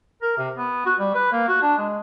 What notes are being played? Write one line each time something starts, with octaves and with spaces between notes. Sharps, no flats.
A#4
C3
B3
F#4
G3
B4
A#3
F#4
D4
G#3